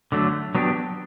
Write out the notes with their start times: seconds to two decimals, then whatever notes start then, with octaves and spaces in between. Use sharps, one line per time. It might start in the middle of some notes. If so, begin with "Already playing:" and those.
0.12 D3 F#3 A3
0.55 F#3 B3 D4 G4